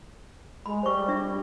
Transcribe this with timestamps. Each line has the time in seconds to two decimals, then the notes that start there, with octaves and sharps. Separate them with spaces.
0.66 G#3 B5
0.83 G3 C5 C#6
1.08 D4 E5